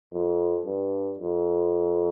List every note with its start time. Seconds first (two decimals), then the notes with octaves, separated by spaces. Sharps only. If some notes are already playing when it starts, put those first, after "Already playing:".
0.12 F2
0.65 G2
1.18 F2